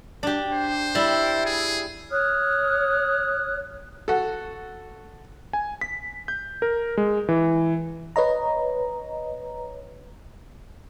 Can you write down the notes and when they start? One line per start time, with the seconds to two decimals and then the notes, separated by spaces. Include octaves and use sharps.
0.23 D4 G4
0.52 C5
0.95 G3 E4
1.45 G#4
2.11 C#5 D#6 F6 F#6
4.08 F#4 A4
5.53 G#5
5.81 B6
6.28 G6
6.62 A#4
6.97 G#3
7.29 E3
8.16 B4 C#5 D#5 A#5